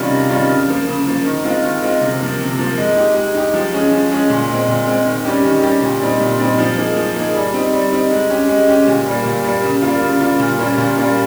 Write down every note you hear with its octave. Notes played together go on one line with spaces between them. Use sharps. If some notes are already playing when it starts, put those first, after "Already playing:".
Already playing: C3 D#3 G3 C#4 F4
C3
D#3 G3 C#4 F4
C#3
F3 A#3
C#3
F3 A#3
D#3
G#3 C4 F4
D#3
G#3 C4 F4
C3
F3 A#3
C3
F3 A#3
G#3
D#4 G4
G#3
D#4 G4
F3
G#3 C#4 G#4
F3
G#3 C#4 G#4
A#2
G#3 C4
A#2
G#3 C4
D#3
G3 C#4 G4
D#3
G3 C#4 G4
A#2
G3 C4 D#4
A#2
G3 C4 D#4
F3
A#3 D#4 G#4
F3
A#3 D#4 G#4
G3
C4 D#4
G3
C4 D#4
G#3
C#4 G4
G#3
C#4 G4
A#2
G3 A#3
A#2
G3 A#3
C#3
G3 A#3 F4
C#3
G3 A#3 F4
A#2
G3 A#3 C#4 F4
A#2
G3 A#3 C#4 F4